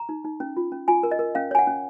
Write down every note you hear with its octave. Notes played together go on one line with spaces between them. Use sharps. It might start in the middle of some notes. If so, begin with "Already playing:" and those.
Already playing: A#5
D#4
D#4
C#4
F4
C#4
F4 G#5
A#4
D#5
A#4
C#4 F5
C#5 G#5
F#5
C#4